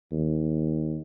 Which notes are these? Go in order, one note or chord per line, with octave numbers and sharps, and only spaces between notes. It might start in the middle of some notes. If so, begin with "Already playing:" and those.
D#2